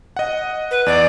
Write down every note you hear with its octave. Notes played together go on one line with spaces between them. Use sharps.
D#5 F#5
B4
E2 D5